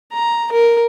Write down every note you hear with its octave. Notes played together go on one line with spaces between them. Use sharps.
A#5
A#4